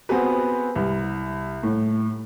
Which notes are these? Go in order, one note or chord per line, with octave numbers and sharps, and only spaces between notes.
B3 C4 F#4 G#4 B4
C2
A2